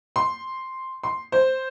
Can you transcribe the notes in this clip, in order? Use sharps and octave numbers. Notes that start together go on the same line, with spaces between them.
C6
C6
C5